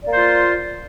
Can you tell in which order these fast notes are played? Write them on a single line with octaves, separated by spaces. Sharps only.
D5 A#3 C5 F4